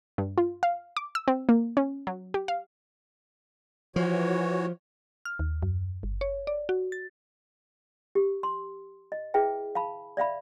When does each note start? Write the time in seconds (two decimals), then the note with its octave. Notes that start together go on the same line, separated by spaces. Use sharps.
0.18 G2
0.38 F4
0.63 F5
0.97 D6
1.15 E6
1.28 C4
1.49 A#3
1.77 C#4
2.07 F#3
2.34 G4
2.48 F5
3.96 E3 F3 F#4 C#5
5.25 F6
5.39 D#2
5.63 F#2
6.03 G1
6.21 C#5
6.47 D5
6.69 F#4
6.92 A6
8.15 G4
8.43 C6
9.12 D#5
9.34 E4 G#4 B4 E5 G5
9.75 F5 A5 B5
10.17 D5 E5 F5 B5